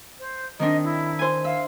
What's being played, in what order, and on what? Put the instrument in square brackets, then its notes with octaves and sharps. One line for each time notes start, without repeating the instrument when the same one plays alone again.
[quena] C5
[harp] D#3 C4 D4 [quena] D#5
[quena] E4
[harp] C5 G#5
[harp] E5 [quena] F5